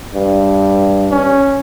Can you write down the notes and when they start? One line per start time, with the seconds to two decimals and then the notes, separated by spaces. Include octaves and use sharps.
0.15 G2
1.11 C#4